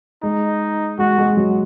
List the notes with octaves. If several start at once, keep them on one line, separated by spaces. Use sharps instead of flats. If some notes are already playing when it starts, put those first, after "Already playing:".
G#3 D#4
G#3 F#4
G#3
F#3